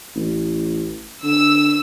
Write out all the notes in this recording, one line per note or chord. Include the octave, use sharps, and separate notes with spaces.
A1
D3 E6